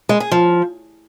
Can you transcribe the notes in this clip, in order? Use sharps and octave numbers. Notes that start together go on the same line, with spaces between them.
G#3
G#4
F3